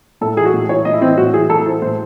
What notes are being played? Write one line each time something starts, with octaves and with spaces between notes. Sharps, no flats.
A2 A4
E3 G#4
F#4
A2
E3 C#5
A2 D#5
E4
E3 C4
A2 F#4
E3 G#4
A2 A4
E3 C5
A2 C5